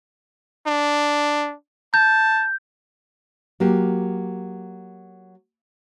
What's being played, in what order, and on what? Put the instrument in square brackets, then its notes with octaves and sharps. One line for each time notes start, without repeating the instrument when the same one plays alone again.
[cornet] D4
[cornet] A5 [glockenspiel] G6
[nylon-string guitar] F#3 A#3 G4